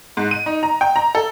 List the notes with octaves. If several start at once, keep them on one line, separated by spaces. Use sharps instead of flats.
G#2
D#7
D#4
A#5
G5
A#5
A4